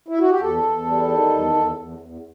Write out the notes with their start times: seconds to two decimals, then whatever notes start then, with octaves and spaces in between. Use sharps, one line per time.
0.08 E4
0.19 F#4
0.30 G4
0.40 E2 A4
0.63 E2
0.86 G3
1.08 D#3
1.31 E2
1.54 E2
1.76 E2
1.99 E2